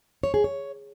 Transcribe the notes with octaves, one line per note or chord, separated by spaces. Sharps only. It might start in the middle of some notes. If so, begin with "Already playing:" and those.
C#5
G#4
C#5